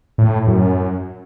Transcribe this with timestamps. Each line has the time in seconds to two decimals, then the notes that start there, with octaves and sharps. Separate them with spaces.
0.18 A2
0.47 F#2